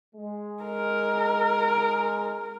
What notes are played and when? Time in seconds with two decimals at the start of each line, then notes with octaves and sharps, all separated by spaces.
0.16 G#3
0.63 A#4